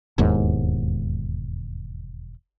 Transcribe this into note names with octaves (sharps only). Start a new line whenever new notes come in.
E1 D#2 G#2